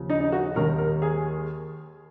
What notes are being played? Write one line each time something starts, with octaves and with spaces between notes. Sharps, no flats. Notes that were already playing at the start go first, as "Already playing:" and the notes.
Already playing: D#2 C#3 F3
D#4
D#4
F#4
D#2 D#3 A#4
A#4
G#4